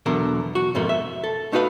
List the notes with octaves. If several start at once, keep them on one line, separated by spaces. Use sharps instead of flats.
E2 B2 D3 F#3 A#4
F#4
F2 G#2 B2 A3 A#3
E5
A4
A3 D#4 F#4 B4 F5